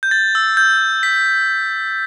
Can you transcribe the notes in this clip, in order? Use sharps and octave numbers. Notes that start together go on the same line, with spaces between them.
G6
A6
E6
G6
B6